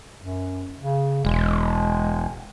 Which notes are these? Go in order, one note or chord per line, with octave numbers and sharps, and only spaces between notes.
F#2
C#3
E1 G#3